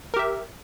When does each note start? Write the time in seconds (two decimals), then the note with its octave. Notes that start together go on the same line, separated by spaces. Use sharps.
0.14 A#4
0.16 G4
0.19 E5